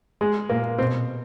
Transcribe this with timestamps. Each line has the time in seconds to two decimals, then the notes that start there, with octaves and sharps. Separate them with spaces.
0.21 G#3
0.50 A#2 A#3
0.78 B2 C4